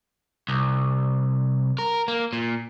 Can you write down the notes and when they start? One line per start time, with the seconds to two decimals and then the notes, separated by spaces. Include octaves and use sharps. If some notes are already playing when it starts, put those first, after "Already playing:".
0.48 C2
1.79 A#4
2.08 A#3
2.33 A#2